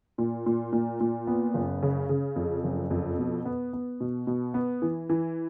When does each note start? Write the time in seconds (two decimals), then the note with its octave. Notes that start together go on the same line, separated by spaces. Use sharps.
0.18 A#2
0.46 A#2
0.72 A#2
1.00 A#2
1.27 B3
1.54 F#1
1.83 C#3
2.09 C#3
2.36 F2
2.64 F#1
2.90 F2
3.18 B2
3.45 B3
3.73 B3
4.00 B2
4.27 B2
4.54 B3
4.82 E3
5.09 E3